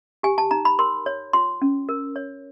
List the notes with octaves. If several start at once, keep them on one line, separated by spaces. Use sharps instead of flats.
G4 G#5
A5
D#4 A#5
B5
A#4 C6
C#5
F4 C6
C#4
A#4
C#5